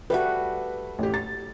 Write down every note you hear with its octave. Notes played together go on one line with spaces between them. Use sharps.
G3 A3 F#4 B4
A1 G4
A6